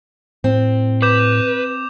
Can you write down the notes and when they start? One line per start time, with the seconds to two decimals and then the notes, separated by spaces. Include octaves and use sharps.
0.44 A2 C4
1.02 B4 D6 G6 E7